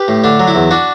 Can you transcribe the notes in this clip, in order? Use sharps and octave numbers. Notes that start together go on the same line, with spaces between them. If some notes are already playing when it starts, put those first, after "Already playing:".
Already playing: G4 B4
A2
D3 D4
F#3
E4
E2
D4 F#4